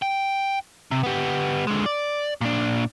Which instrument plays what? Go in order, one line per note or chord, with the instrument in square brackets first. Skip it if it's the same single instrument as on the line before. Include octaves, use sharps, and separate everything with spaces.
[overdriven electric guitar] G5
C3
B3 G4
D3 G#3
D5
A#2 D4